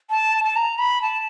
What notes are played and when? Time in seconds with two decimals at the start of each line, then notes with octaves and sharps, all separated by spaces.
0.10 A5
0.44 A5
0.56 A#5
0.79 B5
1.02 A5